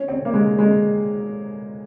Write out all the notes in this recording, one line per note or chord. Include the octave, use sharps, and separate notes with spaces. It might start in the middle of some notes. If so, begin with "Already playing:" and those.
Already playing: C#4
C4
A#3
G#3
G#3